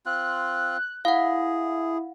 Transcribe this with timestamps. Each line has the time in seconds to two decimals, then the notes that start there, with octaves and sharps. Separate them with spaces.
0.06 C4 F4 F#6
1.05 E4 G#4 F5 F#5